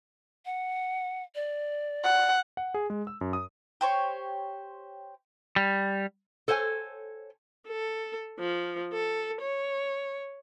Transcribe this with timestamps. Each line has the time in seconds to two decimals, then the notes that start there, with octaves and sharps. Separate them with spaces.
0.46 F#5
1.35 D5
2.04 F#5
2.57 F#5
2.74 G#4
2.90 G#3
3.07 E6
3.21 F#2
3.33 D#6
3.81 G4 C5 C#5
5.56 G3
6.48 A4 C5 C#5 F#5 G#5
7.68 A4
8.39 F3
8.93 A4
9.41 C#5